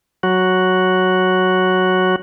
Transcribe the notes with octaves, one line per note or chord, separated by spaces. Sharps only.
F#3 F#4